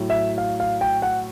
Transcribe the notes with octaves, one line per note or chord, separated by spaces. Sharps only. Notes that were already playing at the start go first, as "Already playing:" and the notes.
Already playing: A2 F#3
E5
F5
F5
G5
F#5